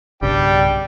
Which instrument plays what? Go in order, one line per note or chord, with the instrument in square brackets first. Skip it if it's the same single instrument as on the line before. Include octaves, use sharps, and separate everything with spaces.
[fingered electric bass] B1 G2 C#3 [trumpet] G3 [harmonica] D4 G5